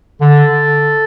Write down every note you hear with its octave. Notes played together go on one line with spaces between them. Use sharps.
D3 A4